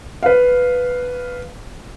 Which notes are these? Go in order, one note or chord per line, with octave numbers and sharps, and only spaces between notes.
B4 F5